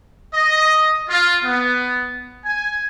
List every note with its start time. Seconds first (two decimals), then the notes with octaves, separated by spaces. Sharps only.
0.34 D#5
1.10 F4
1.44 B3
2.45 G#5